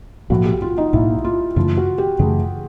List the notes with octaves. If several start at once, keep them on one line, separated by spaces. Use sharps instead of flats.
B1 A2 F3 A#3 F#4
G4
F4
D#4
B1 A2 F3 A#3 E4
F4
F#2 C#3 E3 A3 F4
F#4
G4
F#2 C#3 E3 A3 G#4